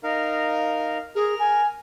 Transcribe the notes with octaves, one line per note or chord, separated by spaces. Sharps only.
D#4 A#4 F5
G#4 A#4 F6
G#5